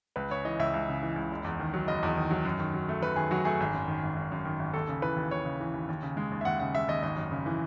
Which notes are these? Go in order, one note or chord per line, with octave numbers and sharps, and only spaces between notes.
C#2 B4
C#3 C#5
E3 D#5
C#2 E5
C#2
C#3
E3
C#2
F#1
E2
D#3
F#3
F#1 D#5
E2
D#3
F#3
F#2
D#3
F#3
A3
F#2 B4
D#3 G#4
F#3 F#4
A3 G#4
G#1
F#2
D#3
G#1
G#1
F#2
D#3
G#1
D#2 A4
C#3
E3 B4
D#2
D#2 C#5
C#3
E3
D#2
D#2
C#3
G#3
D#2
E5
D#2 F#5
C#3 F#5
G#3 E5
D#2 D#5
G#1 D#5
F#2
C#3
E3